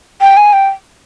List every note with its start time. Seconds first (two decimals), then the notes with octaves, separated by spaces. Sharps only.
0.21 G5
0.37 G#5
0.53 G5